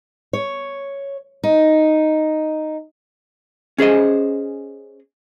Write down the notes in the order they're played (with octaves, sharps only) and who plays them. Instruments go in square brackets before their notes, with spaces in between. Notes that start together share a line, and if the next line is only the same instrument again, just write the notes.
[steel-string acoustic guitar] C#5
D#4
[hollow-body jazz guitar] C#4 G#4 C5 D#5